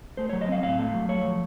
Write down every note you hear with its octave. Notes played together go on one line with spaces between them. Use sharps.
A3 C5
F#3 C#5
D#5
C4 F5
A2 F5
A3
F#3
A3 C#5
F3